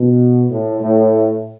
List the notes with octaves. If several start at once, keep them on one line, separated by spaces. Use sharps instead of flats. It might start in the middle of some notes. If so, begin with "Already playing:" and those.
Already playing: B2
A2
A2